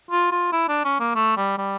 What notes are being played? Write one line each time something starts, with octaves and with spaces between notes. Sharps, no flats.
F4
F4
E4
D4
C#4
A#3
A3
G3
G3